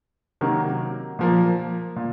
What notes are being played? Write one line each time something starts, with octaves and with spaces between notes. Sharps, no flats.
C3 D#3 F#3 A#3
A#2 F3 A#3
A#2